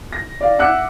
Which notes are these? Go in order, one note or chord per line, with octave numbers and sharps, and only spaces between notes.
A#6
D5 F5
E5 F#5 D6 E6 F#6 C#7